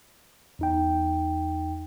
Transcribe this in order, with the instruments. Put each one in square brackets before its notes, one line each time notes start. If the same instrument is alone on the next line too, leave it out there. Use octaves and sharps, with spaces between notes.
[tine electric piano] E2 D#4 G5